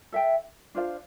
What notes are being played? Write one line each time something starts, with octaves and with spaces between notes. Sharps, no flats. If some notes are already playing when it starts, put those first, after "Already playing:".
A4 E5 G5
D4 F4 C5 F5